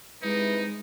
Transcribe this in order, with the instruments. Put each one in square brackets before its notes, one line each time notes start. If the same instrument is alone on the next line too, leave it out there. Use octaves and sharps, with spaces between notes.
[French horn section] C3 E4 B4 [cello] G#3 [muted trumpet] D#4